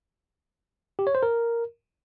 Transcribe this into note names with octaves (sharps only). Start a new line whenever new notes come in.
G4
C#5
C5
A#4